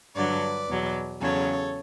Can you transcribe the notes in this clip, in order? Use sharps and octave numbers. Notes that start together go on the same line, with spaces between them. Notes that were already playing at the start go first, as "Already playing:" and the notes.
G2 D3 F#3 B4 D5
E2 B2 F#3
E2 C#3 F#3 A4 C#5